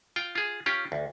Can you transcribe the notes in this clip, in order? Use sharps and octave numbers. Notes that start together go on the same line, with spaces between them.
F4 G5
F4 G#4
C#4 F4 G4
D2